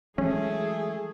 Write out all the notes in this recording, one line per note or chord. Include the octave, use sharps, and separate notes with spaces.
E3 F#3 G#3 A3 C#4 G#4